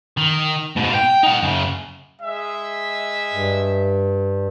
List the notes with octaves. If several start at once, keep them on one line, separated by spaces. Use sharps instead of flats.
D#3
G#2 B2
F5 G5
D#4 F#5
F#2 C#3
G#3 E5
G2